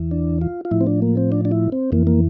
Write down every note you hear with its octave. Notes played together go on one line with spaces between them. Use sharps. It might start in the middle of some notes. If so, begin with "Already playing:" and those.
Already playing: E2 E3
D4
F4
F4
A2 F3 E4
C4
D4
A#3
C4
D4
D4
E4
C4
F2 E3 A#3
A#3